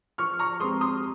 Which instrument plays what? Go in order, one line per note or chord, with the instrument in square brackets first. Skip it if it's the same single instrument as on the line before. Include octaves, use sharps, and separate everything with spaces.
[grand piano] F3 [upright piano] C#6 F6
[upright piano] A#5 C#6
[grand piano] G#3 C4 G4 [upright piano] C6 D#6
[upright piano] C6 D#6